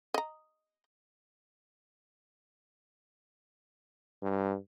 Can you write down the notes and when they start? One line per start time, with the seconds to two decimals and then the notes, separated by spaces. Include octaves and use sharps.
0.14 D#5 A#5
4.23 G2